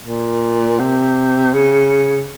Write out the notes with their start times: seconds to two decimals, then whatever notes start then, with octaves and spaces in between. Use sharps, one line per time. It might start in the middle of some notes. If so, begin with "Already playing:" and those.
0.04 A#2
0.79 C3
1.54 C#3